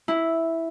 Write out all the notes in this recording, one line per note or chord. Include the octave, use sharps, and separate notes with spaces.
E4